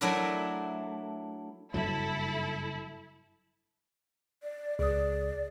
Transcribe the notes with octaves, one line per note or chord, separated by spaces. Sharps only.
F#3 A3 D4 E4 F#4 A#4
F#1 G2 F#3 E4 A4
D5
C#2 G#4 D5 D#6